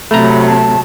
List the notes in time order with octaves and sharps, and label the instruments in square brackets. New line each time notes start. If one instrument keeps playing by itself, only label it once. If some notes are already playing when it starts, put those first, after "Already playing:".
[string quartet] C3 F#3 [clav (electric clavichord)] A3 A#5 [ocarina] B5
[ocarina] A5